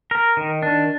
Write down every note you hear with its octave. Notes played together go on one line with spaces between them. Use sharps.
A#4
D#3
D4